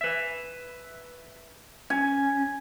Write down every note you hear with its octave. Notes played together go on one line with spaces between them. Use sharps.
B4 E5
C#4 G#5